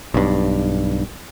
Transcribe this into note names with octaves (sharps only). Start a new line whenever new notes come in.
B1 G2